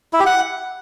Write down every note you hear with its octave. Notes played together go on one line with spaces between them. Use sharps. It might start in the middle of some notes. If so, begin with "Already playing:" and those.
E4
G4
F#5